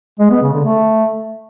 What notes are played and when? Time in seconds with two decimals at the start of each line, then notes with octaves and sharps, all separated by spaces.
0.20 G#3
0.31 B3
0.42 C#3
0.54 D3
0.65 A3